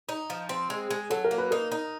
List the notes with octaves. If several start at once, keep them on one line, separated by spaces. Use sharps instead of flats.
D#4
F3
C4
G#3
G#3
F#3 A4
A#4
A#3
B4
D#4 A#4
D#4